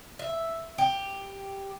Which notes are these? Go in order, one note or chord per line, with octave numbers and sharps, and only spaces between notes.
E5
G4